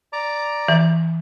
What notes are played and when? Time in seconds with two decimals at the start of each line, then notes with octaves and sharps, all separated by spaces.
0.13 D5 A#5 D6
0.68 E3